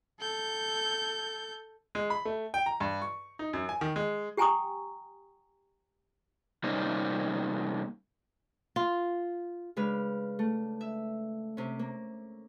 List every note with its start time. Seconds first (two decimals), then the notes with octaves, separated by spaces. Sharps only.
0.21 A4 G6
1.95 G#3
2.10 B5
2.25 A3
2.54 G5
2.66 A#5
2.80 G2
3.02 C#6
3.39 D#4
3.53 F#2
3.69 G#5
3.81 D#3
3.96 G#3
4.37 G4 G5 G#5 A#5 C#6 D#6
6.64 C3 G3 A#3 C#4 D#4 C5
8.76 F4
9.76 C#3 G#3 D4 B4 F6
10.39 A3
10.81 E5
11.57 C3 C#4
11.79 A#3